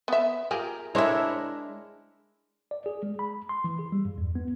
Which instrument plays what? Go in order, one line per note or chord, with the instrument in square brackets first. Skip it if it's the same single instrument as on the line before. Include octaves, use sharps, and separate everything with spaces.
[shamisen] B3 E5
[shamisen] F4 G4 G#4 [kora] A#4
[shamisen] D3 C5 [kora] G#3 D4 A#4 [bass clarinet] E4 [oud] C#5 E5
[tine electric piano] D5
G#4
G#3
B5
C6
E3
G#4
G3
G2
E2
B3